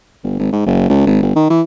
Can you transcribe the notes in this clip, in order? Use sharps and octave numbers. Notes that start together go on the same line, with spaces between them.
G1
G#1
G#2
F#1
C#2
G#1
G1
D#3
E3